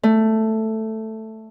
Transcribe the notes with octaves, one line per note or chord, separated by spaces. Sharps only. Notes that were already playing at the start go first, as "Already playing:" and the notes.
A3